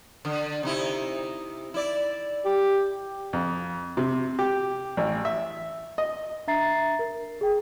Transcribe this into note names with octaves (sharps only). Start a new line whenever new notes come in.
D3
C3 D#4 E4
E4 D5
G4
F2
C3
G4
A1
E5
D#5
D4 E5 A#5 A6 C7
A#4
G#4 G5